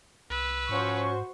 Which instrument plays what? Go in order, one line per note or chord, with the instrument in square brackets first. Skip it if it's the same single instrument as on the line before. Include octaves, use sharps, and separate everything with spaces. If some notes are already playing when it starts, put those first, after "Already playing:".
[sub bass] C2 [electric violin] B4 E6
[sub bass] G#2 [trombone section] F3 C#4 [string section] F#4 C5 C#6